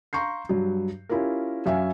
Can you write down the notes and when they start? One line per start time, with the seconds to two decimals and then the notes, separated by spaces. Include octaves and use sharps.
0.13 F5 A#5 C6 C#6 G6 C7
0.49 G2 F#3
1.09 C#4 E4 F4 G4 A#4
1.66 F#2 E5 F5 G#5